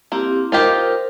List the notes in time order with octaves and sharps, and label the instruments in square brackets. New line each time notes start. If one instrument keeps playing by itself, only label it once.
[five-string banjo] A#3 [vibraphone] C4 E4 G4
[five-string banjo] D#4 F4 G4 [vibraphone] A#4 C5